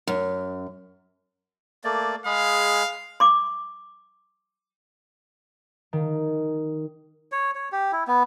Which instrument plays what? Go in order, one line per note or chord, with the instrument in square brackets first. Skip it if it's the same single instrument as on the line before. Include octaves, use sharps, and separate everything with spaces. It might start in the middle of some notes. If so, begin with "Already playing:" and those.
[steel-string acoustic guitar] F#2
[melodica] A3 A#3 D5
[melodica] G#3 G#4 B5 [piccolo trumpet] F5
[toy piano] C6 D6
[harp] D#3
[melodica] C#5
C#5
G4
E4
B3